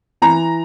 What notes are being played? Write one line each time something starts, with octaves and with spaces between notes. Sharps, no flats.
E3 A#5